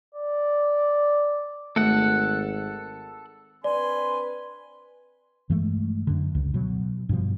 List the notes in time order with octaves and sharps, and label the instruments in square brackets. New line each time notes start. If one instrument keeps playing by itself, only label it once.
[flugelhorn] D5
[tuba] G#1 [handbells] A3 [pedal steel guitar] A4 F#5
[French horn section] C4 D4 B4 [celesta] D5 [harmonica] G#5 C6
[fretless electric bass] G2 E3 G#3 A3
F#2 D3
C#2
B2 F#3
G2 B2 F3